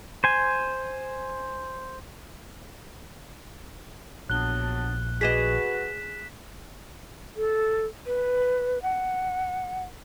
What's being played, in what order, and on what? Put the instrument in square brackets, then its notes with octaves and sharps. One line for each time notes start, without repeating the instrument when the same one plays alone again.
[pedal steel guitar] C5 G#5
[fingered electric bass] A#1 [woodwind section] F#3 B3 D4 [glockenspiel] F#6 G7
[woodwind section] F#4 B4 [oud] G#4 D5 D#5 [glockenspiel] B6 E7
[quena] A4
B4
F#5